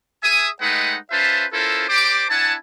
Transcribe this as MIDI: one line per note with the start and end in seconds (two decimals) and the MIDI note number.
0.23 0.48 68
0.23 0.48 76
0.23 0.48 80
0.23 0.48 87
0.61 0.95 56
0.61 0.95 57
0.61 0.95 63
0.61 0.95 71
0.61 0.95 78
0.61 0.95 79
1.10 1.44 61
1.10 1.44 65
1.10 1.44 71
1.10 1.44 72
1.10 1.44 76
1.10 1.44 81
1.52 1.85 61
1.52 1.85 64
1.52 1.85 65
1.52 1.85 69
1.52 1.85 70
1.52 1.85 72
1.88 2.23 67
1.88 2.23 72
1.88 2.23 74
1.88 2.23 86
2.30 2.54 62
2.30 2.54 64
2.30 2.54 78
2.30 2.54 80
2.30 2.54 81